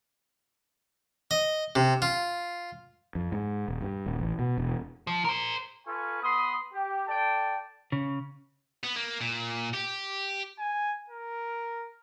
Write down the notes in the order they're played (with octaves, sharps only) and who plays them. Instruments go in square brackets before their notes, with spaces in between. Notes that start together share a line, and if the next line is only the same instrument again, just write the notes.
[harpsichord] D#5
C3
F4
[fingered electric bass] F2
G#2
D#1
G2
D#1
A1
B2
E1
[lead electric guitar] F3
A#4 C5
[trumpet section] F4 A4 B4 G#5 C#6
B3 B5 C6 D#6
G4
A4 D5 G5 A5
[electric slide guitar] C#3
[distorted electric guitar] B3
A#3
A#2
G4
[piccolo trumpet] G#5
A#4